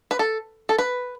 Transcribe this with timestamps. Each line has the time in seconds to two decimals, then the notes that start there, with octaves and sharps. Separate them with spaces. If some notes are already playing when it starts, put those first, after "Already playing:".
0.11 B4
0.19 A4
0.69 A4
0.78 B4